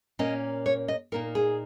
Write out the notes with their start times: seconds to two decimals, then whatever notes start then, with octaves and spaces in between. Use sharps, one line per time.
0.19 A#2 A#3 C#4 D#5
0.66 C#5
0.88 D#5
1.12 A#2 A#3 D#4 A#4
1.35 G#4